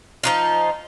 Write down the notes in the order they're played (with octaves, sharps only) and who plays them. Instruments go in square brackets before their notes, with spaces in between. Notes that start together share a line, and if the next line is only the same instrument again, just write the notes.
[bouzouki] F3 D#4 F4